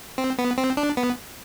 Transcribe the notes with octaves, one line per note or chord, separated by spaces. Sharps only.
C4
B3
C4
D4
B3